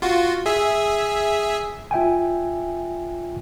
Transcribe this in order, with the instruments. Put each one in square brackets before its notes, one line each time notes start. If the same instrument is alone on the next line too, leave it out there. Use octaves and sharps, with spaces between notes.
[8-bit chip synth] F4 F#4
G#4 E5
[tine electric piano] F4 E5 G5 G#5